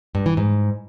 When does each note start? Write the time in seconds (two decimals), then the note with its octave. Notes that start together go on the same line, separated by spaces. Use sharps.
0.15 G2
0.26 E3
0.37 G#2